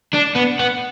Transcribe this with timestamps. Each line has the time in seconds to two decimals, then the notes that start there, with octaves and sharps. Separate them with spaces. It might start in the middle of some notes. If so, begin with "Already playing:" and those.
0.13 D4
0.35 B3
0.59 B3